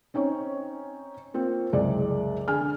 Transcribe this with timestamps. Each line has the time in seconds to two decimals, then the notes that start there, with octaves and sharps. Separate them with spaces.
0.14 C4 C#4 D#4 C#5
1.34 A#3 C4 F4
1.73 F#1 C2 G#3 D5
2.48 D3 G#4 G#5 F6